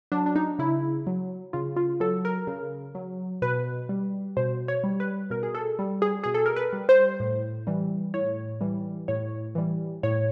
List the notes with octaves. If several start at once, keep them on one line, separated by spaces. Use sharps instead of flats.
F#3 D4
D4
D#4
C#3 E4
F#3
C#3 F4
F4
F#3 A4
A#4
C#3
F#3
B2 B4
G3
B2 C5
C#5
G3
B4
B2 A#4
G#4
A4
G3
G#4
B2 G#4
A4
A#4
B4
G3
C5
A2
E3 G3
A2 C#5
E3 G3
A2 C#5
E3 G3
A2 C#5